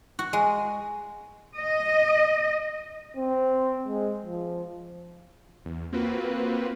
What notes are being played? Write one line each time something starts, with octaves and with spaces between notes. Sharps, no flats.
F#4
G#3
D#5
C4
G#3
F3
E2
A#3 C4 F4 F#4 B4